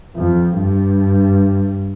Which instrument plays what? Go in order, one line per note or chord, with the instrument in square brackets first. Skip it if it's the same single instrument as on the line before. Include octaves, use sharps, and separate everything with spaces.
[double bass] F2
G2